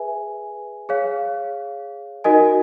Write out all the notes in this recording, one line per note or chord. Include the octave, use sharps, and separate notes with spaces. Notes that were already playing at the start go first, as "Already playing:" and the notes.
Already playing: G#4 B4 E5 G#5
G#4 C#5 F5
D#4 F#4 A#4 D#5 G#5